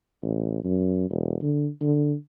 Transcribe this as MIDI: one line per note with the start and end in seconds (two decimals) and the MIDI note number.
0.23 0.60 33
0.64 1.09 42
1.11 1.36 28
1.42 1.69 50
1.81 2.14 50